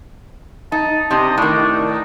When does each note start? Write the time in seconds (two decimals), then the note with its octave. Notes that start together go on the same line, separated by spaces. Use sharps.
0.72 D#4 A5
1.11 C3 D4 D#5
1.38 A2 D#3 D4
1.89 D#4